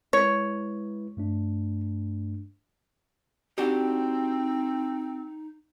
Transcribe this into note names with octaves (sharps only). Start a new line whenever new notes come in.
G#3 E4 B4 C#5
G2 A3 D4
C4 D4 D#4 F#4 G4